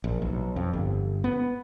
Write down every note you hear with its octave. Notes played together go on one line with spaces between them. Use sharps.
A#1
B1
F2
G1
B3